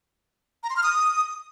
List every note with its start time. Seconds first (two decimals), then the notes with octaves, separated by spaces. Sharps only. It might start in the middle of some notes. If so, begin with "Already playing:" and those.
0.63 A#5
0.70 C6
0.77 F6
0.83 D#6